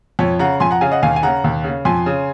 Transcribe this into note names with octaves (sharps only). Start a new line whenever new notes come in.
F2 C#5
C#3 F#5 A#5
F2 G#5 C6
F#5 A#5
C#3 F5 G#5
D#5 F#5
D#2 F5 G#5
G#5
C#3 F#5 A#5
D#2
C#3
F2 G#5 C6
C#3